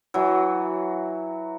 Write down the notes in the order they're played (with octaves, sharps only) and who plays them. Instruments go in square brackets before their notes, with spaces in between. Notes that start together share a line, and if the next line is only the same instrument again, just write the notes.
[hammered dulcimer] E3 F#3